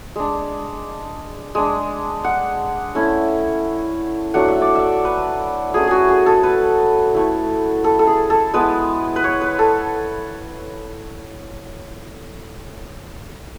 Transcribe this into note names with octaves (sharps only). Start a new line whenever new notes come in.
G#3 D4
G#3 D4
F#5
A3 C#4 E4
F#3 A3 D4 F#5
E5
D5
E5
B4
F#3 A3 C#4 G#4
F#4 G#4
G#4
A4
B4
A3 E4
A4
A4
G#4
A4
G#3 B3 E4 B4
B4
C#5
B4
A4